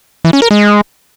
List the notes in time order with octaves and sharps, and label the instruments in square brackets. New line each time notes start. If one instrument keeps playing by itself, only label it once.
[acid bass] E3
C#4
A#4
G#3